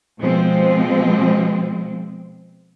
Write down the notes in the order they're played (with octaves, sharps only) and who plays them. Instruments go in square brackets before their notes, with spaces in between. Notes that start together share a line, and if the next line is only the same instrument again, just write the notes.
[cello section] B2 F3 G#3 C4